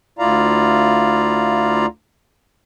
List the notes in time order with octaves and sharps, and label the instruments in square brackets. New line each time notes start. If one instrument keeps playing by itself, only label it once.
[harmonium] D2 E4 F4 D5 F5 A#5